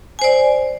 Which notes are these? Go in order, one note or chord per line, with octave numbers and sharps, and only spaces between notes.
C5 D5 G#5